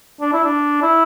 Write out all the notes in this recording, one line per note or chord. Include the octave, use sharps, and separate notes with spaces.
D4
E4
D4
E4